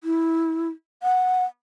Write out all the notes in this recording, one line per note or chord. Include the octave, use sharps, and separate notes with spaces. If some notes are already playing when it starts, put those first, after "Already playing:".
E4
F#5